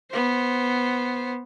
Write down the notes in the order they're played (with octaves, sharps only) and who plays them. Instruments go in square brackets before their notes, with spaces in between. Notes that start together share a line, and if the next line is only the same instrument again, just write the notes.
[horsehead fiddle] B3 C5